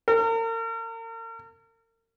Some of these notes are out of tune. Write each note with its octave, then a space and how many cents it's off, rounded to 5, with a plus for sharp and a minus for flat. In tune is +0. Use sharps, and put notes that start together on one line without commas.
A#4 -40